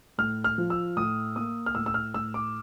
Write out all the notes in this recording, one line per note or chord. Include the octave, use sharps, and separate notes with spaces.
A2 F6
F6
F3
E6
A2 D#6
A#3 D#6
F6
A2 E6
E6
F6
A2 E6
D6